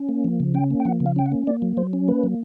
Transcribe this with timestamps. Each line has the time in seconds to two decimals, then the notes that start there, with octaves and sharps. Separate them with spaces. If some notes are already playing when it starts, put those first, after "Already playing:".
Already playing: C#4
0.09 A#3
0.24 F3
0.40 C#3
0.54 C#4 G5
0.70 A#3
0.80 G5
0.85 F3 F#5
1.00 C#3
1.06 F5
1.16 C#4 G5
1.26 F#5
1.32 A#3
1.47 A#3 D5
1.62 F#3
1.77 F#3 C5
1.93 C#4
2.08 A#3 B4
2.24 F#3